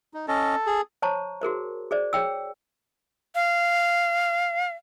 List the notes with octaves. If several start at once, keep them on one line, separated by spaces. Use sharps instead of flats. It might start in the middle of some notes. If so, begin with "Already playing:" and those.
D#4
C#4 A4 D#5
G#4
C5 C#5 A5 A#5 C#6
F#4 G#4 A#4 C5
G#4 C5 D5
G#4 C#5 G5 E6
F5